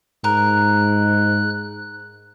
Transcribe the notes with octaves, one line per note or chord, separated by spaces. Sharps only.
G#2 A#4 F#6